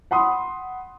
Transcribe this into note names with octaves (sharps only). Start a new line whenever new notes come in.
F#5 B5 C6 D#6